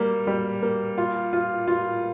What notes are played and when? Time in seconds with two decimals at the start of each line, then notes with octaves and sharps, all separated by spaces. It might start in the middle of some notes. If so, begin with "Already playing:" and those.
Already playing: G3 A#3
0.27 G3
0.62 A#3
0.98 F4
1.33 F4
1.68 F4